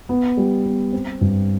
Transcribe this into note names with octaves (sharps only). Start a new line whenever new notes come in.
B3
G3
B3
C4
G2